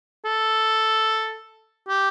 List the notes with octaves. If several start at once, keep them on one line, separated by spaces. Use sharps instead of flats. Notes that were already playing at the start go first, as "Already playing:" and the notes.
A4
G4